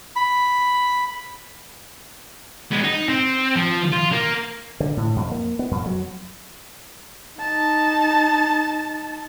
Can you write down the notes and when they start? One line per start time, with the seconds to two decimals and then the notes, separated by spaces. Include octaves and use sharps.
0.16 B5
2.71 G#3 B3
2.84 D#4
3.09 C4
3.56 F3
3.92 F4
4.12 A#3
4.80 D3
4.97 A2
5.16 F2
5.31 A#3
5.59 B3
5.71 F2
5.86 F#3
7.40 D#4 A5